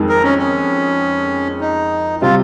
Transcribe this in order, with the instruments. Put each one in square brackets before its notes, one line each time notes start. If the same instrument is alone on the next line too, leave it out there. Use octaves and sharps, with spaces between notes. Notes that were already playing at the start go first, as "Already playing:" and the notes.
Already playing: [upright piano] F2 D#3 G#3
[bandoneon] A#4
C#4
C#4
D#4
[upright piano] C3 G3 [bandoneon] F4